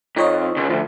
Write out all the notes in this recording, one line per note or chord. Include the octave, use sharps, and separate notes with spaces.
F2 D#4 C#5 D#5
C#2
D2 F3